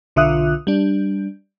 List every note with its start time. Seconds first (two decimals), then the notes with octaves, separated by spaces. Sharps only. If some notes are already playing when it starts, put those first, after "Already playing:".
0.16 B1 D3 F4 E5 D#6 F#6
0.67 G3 D4